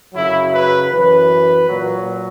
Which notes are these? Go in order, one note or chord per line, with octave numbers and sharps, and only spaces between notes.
F#2 C#3 F#3 E4
B4
F#2 E3 B4
A#2 F#3